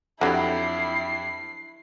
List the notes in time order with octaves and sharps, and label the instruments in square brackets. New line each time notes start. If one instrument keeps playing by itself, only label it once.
[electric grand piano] F2 G4 [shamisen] D3 F#3 [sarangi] E4 [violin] C7